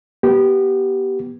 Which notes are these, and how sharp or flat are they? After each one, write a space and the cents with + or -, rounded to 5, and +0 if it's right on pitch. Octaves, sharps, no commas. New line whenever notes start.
B3 -20 G4 -15